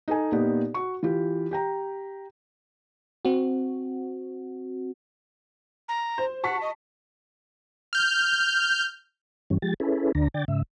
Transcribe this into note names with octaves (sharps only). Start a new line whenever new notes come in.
D#4 A4 G#5
A#2 B3 D#4 G4
F#4 C#6
E3 F4 G4
G4 G5 A#5
C4 F#4
A#5
C5
F#5 A5 C#6 B6
D#5
F6 G6
G2 E3 G3 C#4
F3 G#3 G4 A6
C#4 E4 G#4 A4 B4
D2 D3 D4 A#5
D3 D5 G5 A6
G#2 C#3 E5